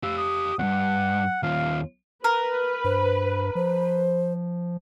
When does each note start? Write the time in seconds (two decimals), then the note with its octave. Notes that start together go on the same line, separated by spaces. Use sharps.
0.03 G4 F5 E6
0.18 D#6
0.59 E2 G2 F#5
1.43 D#2 F4 F5
2.24 A#4 B4
2.84 G2 C5
3.55 F3 C5